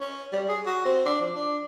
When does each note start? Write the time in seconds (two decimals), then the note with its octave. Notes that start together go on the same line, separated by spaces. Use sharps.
0.01 C#4
0.33 G3
0.49 G#4
0.66 F#4
0.85 C4
1.05 D4
1.21 F3
1.35 D4